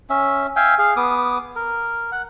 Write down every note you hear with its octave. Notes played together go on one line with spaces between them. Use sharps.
C#4 E5
E5 F5 G5 G#5
G#4 F5
B3 D6 D#6
A#4
F#5